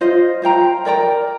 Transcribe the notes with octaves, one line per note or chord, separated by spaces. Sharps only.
F4 C5 D#5
F4 C5 G5 A#5
A#4 D5 G5 A#5